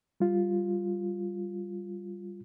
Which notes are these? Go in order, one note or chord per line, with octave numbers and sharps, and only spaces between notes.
G3 F4